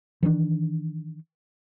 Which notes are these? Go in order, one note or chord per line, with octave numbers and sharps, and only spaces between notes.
D#3 E3 G#3 D4